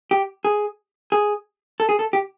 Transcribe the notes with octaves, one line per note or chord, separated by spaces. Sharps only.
G4
G#4
G#4
A4
G#4
A4
G4